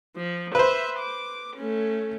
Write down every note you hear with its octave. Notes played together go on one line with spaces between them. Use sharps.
F3
B4 C5 E5
D6
A3 C#4